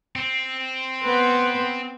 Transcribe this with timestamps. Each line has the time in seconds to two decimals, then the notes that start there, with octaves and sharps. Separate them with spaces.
0.16 C4
1.02 B3 B4 C5